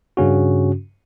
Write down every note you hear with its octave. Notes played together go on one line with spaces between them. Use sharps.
G2 C#3 C#4 F#4